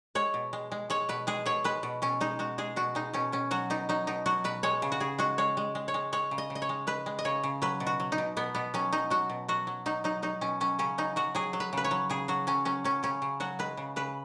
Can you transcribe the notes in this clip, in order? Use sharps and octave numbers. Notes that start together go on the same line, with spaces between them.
G#3 C#5
B2
G#3
G#3
G#3 C#5
B2 B4
G#3 G#4
B2 C#5
G#3 B4
B2
B2 C#4
G#3 D#4
G#3 F#4
G#3 G#4
B2 F#4
G#3 D#4
B2 C#4
B2 C#4
F#3 F#4
B2 D#4
F#3 D#4
B2 D#4
F#3 F#4
B2 B4
G#3 C#5
C#3
F#4
C#3 G#4
G#3 F#4
G#3 C#5
G#3
G#3
C#5
G#3
G#3 C#5
C#3
D#5
C#3
D#5
C#5
G#3
G#3 B4
G#3
D#5
C#3 C#5
C#3
F#3 B4
B2
F#4
F#3
D#4
B2
B2 B3
B2 B3
F#3 C#4
F#3 D#4
F#3 F#4
B2
F#3 F#4
F#3
F#3 D#4
F#3 D#4
F#3 D#4
B2 C#4
F#3 C#4
C#3 C#4
F#3 D#4
F#3 F#4
F#3 G#4
F#3
B4
C#3 B4
C#5
F#3
C#3 G#4
F#3 F#4
F#3 C#4
F#3 C#4
F#3 C#4
C#3 C#4
C#3
F#3 F#4
G#3 B4
C#3
C#3 B4